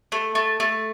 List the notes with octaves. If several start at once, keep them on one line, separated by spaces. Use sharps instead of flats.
A3
A3
A3